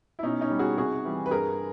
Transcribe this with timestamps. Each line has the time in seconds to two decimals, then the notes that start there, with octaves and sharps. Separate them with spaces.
0.19 E4
0.23 B2 C#4 D#4
0.41 C#4 D#4
0.50 G3
0.59 F#4 G#4
0.77 C3 F#4 G#4
1.04 E3 G3
1.26 B4
1.31 G2 G#4 A#4